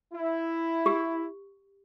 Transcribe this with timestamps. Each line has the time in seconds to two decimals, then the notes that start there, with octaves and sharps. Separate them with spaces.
0.14 E4
0.86 G4